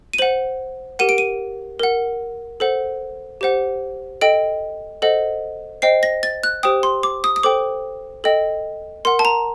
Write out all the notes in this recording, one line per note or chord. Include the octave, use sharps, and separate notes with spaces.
D#7
C5 F#5 F#7
G4 A#4 F#5 D#7
D7
D#7
A#4 F#5
A4 C5 F#5
G4 C5 F#5
A4 D#5 G5 D7
A4 C5 D#5 F#5
C5 D#5 G5 C7
A#6
A6
F#6
G4 C5 G5 D#6
C6
D6
D#6
D#6
A4 C5 G5 D6
A4 D#5 G5
A#4 F#5 C6
A5
A#5